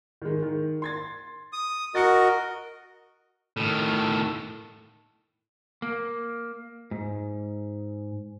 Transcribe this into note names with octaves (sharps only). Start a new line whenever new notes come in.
D#3 G#3
D#3
C6 G#6 A6
D#6
F#4 A#4 D#5 A6 C#7
A2 D#3
A#3
G#2